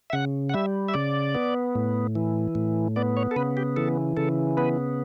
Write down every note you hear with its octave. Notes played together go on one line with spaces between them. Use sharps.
E5
C#3 F#5
F#5
G3 E5
E5
C#3 D5
B3
A2
E3
A2
B3 D5
C#5
A4
C#3 B4
G4
E3 A4
C#3 A4
B3 B4